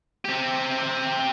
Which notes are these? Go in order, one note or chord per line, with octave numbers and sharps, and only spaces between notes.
C4 G4